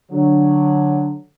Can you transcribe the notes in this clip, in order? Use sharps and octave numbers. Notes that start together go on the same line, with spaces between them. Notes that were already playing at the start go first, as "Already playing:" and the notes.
D3 F#3